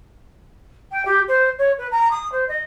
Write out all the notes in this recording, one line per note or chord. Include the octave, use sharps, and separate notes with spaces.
G5
G4
C5
C#5
B4
A#5
D#6
C5
D#5